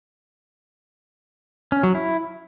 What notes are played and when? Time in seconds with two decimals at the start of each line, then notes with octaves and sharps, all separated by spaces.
1.72 C#4
1.83 F#3
1.95 E4